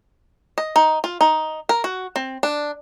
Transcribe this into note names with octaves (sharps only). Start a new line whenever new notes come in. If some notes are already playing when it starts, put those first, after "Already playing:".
D#5
D#4
F4
D#4
A#4
F#4
C4
D4